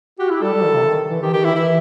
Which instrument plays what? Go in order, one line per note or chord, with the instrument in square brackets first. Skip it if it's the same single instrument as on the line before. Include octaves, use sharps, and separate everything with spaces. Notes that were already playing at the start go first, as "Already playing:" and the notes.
[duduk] F#4 [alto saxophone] G4
[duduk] E4 [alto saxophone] G4
[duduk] G3 [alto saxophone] A4
[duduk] G3
D#3
C3
D#3
E3
[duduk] D#3 [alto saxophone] G4
[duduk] D#3 [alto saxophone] G4
[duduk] E3 [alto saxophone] E4
[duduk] E3 [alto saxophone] E4